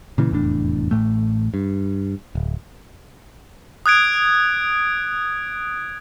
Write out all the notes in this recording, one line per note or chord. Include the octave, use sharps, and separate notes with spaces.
A#2 C#3 E3
F1 E2 A2 D4
A1 A2 A3
G2
D1
D#6 F#6 G#6 D7